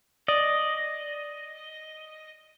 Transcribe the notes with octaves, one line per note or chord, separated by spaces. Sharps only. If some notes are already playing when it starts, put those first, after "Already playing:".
D5 D#5